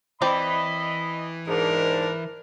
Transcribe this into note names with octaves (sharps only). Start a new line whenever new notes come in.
E3 C4 D5 D#5 B5
G#2 D4 A#4